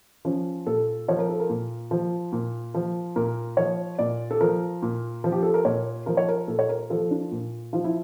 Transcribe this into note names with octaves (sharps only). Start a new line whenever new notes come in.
F3 C#4
A#2 A4
F3 C#5
A#4
A4
A#4
A#2
F3
A#2
F3
A#2 A#4
F3 C#5
A#2 D5
A4
F3 A#4
A#2
F3
G4
A4
A#4
A#2 C#5
F3 A#4
C#5
A#4
A#2 A4
C#5
A#4
F3 A4
D4
A#2
F3 F4
E4